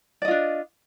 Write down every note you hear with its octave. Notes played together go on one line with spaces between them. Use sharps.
D4 F4 D5 D#5